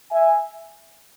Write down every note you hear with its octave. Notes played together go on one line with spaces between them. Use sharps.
E5 G#5